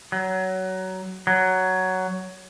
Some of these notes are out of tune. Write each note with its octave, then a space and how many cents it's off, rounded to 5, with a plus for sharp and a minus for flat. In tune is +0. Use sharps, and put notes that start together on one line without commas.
F#3 +20
F#3 +10